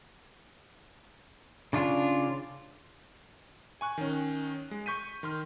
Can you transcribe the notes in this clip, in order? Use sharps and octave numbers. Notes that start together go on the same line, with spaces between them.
C#3 D4 F4
G#5 C#6 F#6
D#3 C#4
G#3
C#6 G6 B6 D#7
D#3 C6 F6